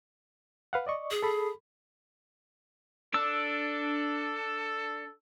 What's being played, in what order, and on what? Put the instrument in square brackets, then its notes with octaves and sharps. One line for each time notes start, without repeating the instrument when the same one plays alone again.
[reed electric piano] B4 F5 F#5
D5 D#5 C#6
[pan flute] G#4
[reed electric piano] A4 B5
[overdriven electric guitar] D4 [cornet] A4 [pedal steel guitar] E6